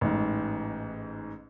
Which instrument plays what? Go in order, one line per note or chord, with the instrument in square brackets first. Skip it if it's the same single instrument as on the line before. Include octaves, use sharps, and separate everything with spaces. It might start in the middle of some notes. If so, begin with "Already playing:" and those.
[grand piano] A1 G#2